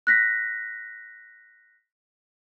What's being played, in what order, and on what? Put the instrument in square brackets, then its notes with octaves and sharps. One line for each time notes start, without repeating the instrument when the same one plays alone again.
[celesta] F#6 A#6 B6